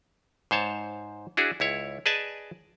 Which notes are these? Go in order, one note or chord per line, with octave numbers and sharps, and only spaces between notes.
G#2 C5 C#5 A5
D4 E4 F#4 G#4
C#2 E4 C#5
G#4 B4 D5 D#5 G#5 A5